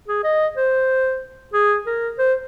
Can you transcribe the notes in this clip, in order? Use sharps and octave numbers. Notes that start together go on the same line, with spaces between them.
G#4
D#5
C5
G#4
A#4
C5